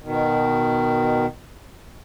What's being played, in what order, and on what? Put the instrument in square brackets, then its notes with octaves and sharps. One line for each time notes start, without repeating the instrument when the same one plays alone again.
[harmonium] B2 D#3